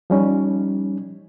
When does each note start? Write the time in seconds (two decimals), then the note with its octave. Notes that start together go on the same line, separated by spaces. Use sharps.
0.10 F3 G3 C#4 D#4